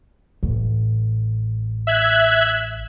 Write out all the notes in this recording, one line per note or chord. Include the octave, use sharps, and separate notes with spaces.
A1
E5 F#6 G#6